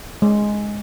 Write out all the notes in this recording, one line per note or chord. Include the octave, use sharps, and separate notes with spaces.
G#3